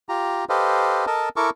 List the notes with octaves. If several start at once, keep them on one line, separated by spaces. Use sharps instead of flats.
F4 G4 A#5
G4 A4 B4 C5 D#5 F5
A4 A#4 D#5 A5
E4 A4 A#4 C#6 D6